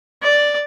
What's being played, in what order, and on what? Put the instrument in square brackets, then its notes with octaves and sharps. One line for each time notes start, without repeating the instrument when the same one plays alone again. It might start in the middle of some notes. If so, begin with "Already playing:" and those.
[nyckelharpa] D5